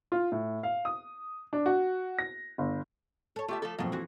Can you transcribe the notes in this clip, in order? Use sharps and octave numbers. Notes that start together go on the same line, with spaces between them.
F4
A2
F5
D#6
D4
F#4
A#6
G1
A4 C#5
A3 F4 G4 E5
F3 A3 A4
A#1 F2 B2 F3 F#3 C4
E3 F#4